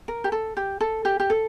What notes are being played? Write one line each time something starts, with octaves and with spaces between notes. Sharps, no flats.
A#4
G4
A4
G4
A4
G4
G4
A4